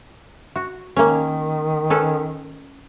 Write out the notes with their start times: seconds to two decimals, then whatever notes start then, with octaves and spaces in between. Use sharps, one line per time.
0.56 F#4
0.96 D#3 A#3 C#4
1.90 C#4 A4 B4